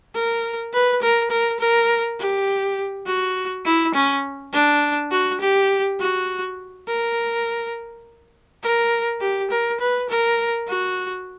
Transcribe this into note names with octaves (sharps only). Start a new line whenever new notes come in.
A#4
B4
A#4
A#4
A#4
G4
F#4
E4
C#4
D4
F#4
G4
F#4
A#4
A#4
G4
A#4
B4
A#4
F#4